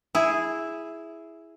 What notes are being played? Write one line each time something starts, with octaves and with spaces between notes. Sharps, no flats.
E4 G#4